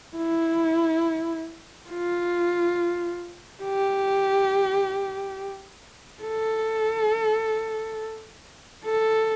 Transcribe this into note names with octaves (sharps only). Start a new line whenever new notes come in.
E4
F4
G4
A4
A4